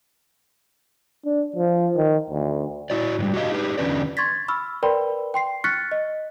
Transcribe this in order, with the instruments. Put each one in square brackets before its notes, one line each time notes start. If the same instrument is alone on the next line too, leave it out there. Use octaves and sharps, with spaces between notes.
[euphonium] D4
F3
D#3
D2
[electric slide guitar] E4 F#4 D5
G#2 E3 G3
F#4 G4 C5 D#5 F5
D#4 G4 B4
E2 D3 A3 C#4 B4 D5
[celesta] C6 C#6 G#6 A6 B6
B5 C#6 E6 F6
A#4 B4 D5 G5 B5 C6
G5 C6 C7
C#6 F6 F#6 A6 B6 C#7
D#5